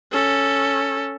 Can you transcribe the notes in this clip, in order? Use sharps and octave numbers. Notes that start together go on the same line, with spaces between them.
C#4 A4